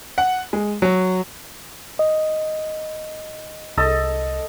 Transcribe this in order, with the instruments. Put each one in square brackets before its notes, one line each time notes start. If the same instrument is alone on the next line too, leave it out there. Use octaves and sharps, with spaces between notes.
[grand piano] F#5
G#3
F#3
[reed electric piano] D#5
[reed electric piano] C2 [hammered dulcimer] A4 D#5